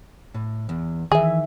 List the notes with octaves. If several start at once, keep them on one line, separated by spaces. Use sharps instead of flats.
A2
E2
D#3 E3 G#4 E5 G#5